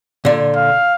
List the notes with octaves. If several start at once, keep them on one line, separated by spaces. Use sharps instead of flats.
A#2 D3
F5